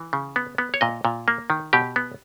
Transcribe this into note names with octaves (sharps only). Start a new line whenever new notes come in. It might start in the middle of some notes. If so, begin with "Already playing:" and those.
Already playing: E3
C#3
B3
B3
C#5
A#2 D#5
A#2
A#3
D#3
B2 G4
B3